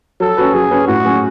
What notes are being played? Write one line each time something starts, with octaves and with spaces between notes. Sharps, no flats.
F#3 A4
C#4 F#4 B4
F#3 G#4
C#4 F#4 B4
A2 F#4
F#3 C#4 G#4